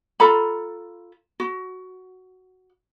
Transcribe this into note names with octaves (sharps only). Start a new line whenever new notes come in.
F4 A4 A#5 B5
F#4